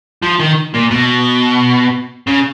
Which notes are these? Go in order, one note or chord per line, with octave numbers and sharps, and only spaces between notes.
F3
D#3
A#2
B2
C#3